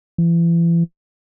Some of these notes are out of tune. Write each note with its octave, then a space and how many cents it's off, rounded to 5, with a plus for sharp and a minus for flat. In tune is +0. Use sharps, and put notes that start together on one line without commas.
E3 +35